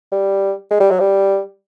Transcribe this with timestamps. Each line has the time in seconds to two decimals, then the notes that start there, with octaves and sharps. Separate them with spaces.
0.12 G3
0.71 G#3
0.80 G3
0.91 F#3
1.00 G3